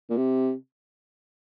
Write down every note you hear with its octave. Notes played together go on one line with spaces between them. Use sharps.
A#2
C3